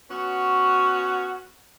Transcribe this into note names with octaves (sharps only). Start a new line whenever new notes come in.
B3 C#4 F#4